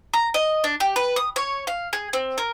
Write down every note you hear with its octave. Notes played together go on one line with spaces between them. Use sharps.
A#5
D#5
D4
G4
B4
D#6
C#5
F5
G#4
C4
A#4